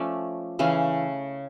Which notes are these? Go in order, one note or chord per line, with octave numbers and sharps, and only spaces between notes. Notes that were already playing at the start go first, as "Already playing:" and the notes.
Already playing: F3 A3 C#4 D5
C#3 E3 A3 C#4 F5